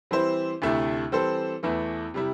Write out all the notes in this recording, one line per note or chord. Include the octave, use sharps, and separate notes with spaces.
E3 G3 C4 E4 C5
D2 C3 A3 E4
E3 G3 C4 A4 C5
E2 E3 A3 E4
C3 G3 E4